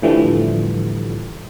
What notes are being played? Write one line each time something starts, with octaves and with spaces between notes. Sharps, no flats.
A2 D3 E3 F3 G3 A3